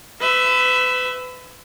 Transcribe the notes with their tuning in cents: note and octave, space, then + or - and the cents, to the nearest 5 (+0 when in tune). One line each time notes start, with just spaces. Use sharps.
B4 +35 E5 +0